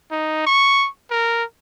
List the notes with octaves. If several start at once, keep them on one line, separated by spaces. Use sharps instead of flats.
D#4
C#6
A#4